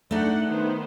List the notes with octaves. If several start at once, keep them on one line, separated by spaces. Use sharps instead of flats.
A3 D4 D#4 F#5
D#3 B3 C5